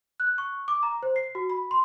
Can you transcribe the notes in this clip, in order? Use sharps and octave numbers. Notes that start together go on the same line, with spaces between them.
F#6
C#6
D6
A#5
C5
C7
F#4
B5
C6